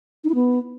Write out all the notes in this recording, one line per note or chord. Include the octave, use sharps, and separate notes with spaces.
D#4
E4
B3